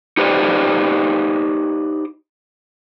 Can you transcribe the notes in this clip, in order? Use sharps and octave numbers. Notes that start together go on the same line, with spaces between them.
D#4 G4 B4 C5 D5 D#5